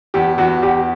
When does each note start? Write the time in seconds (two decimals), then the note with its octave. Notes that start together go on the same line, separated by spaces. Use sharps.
0.14 E2 G4
0.38 E2 F#4
0.62 E2 G4